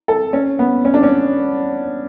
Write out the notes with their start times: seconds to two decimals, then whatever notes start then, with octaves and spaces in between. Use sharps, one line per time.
0.08 A4
0.33 C#4
0.59 B3
0.85 C#4
0.94 D4
1.03 C#4